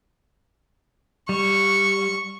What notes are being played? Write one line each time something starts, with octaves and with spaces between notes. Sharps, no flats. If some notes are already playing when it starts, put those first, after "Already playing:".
G3 C#6